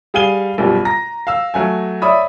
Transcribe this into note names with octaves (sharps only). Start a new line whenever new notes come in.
G3 G#4 F5 G#5 D#7 G7
A#1 F#2 B2 G3
A#5 A#6
F5 E6
F#3 A3 G#5
C#5 D5 E5 B5 D#6